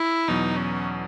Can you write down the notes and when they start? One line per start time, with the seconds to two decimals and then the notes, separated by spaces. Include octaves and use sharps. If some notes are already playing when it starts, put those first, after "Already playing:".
Already playing: E4
0.28 E2 B2 F#3 D#4
0.56 C#4